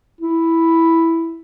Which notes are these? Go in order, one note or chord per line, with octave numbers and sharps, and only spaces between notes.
E4